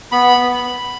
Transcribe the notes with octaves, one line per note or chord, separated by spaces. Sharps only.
B3 B5
B3